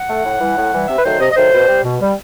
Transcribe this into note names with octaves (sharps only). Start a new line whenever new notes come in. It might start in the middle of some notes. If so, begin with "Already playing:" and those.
Already playing: F#5
A3
A2
E3 G3
A2
E3 G3
C3 E5
B4
D#3 F#3 A3 C5
C3 D#5
D#5
D#3 F#3 A3 C5
B2
G3
B2
G3